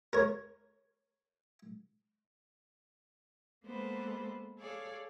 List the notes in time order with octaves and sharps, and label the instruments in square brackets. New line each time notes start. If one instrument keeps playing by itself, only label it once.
[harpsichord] A#4 C#5
[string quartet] G#3 A#3 B3 A4 B4 C5
G#4 A4 C#5 D5 F5